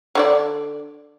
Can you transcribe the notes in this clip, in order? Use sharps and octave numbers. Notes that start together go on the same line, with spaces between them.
D3 F#4 D5